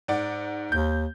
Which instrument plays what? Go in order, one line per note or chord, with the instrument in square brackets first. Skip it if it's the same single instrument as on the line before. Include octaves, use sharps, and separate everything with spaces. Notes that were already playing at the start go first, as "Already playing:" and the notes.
[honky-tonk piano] G#2 D5 F#5
[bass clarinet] D#2 [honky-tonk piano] G6